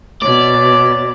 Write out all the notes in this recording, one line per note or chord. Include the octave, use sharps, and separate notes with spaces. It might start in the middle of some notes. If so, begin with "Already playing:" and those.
B2 C#5 D5